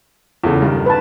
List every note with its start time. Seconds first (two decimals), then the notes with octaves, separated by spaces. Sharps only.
0.44 E2 C#3 F4 A4
0.62 G2 D#3
0.86 B4 A5